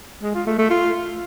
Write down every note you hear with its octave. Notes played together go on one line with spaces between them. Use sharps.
G#3
F4
A3
A3
F4